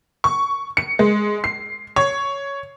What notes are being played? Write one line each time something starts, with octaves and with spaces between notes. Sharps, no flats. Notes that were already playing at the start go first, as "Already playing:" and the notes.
C#6
C#7
G#3
C7
C#5